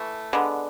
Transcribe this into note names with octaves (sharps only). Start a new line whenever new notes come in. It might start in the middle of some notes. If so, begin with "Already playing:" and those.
Already playing: E3 A3
D3 G#3 B3